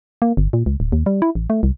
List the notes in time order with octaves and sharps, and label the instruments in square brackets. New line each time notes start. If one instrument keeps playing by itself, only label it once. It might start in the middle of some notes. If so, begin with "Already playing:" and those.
[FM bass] A#3
G1
A#2
C#2
D1
D#2
G3
E4
A1
A3
C2